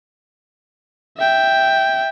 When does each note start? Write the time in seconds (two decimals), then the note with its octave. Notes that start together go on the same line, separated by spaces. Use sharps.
1.17 E5 G5